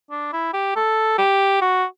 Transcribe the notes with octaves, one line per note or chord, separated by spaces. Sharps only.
D4
E4
G4
A4
G4
F#4